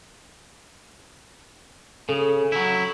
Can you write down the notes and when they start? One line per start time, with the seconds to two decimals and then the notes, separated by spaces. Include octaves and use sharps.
2.09 C#3 A4
2.52 F#3 E4